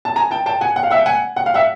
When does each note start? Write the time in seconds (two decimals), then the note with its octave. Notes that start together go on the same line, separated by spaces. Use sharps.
0.05 A5
0.16 G#5 A#5
0.31 G5 A5
0.46 G5 A5
0.61 F#5 G#5
0.76 F#5
0.83 F5
0.90 E5 F#5
0.99 G5
1.06 F#5 G#5
1.36 F#5
1.46 F5
1.54 E5 F#5